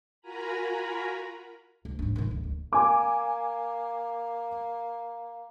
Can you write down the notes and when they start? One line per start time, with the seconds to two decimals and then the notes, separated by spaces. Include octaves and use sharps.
0.21 F4 F#4 A#4 G#5 A#5 B5
1.85 D2
1.99 G#2 D4
2.16 G#2 D#3
2.31 D1
2.44 D2
2.73 A#3 G#5 D6